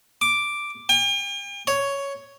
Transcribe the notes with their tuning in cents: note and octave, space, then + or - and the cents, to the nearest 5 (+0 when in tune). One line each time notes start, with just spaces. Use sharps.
D6 +0
G5 +45
C#5 +5